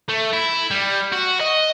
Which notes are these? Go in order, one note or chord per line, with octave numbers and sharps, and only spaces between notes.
A3
E4
G3
F#4
D#5